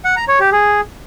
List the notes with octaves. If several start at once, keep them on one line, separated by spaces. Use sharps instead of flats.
F#5
A#5
C#5
G4
G#4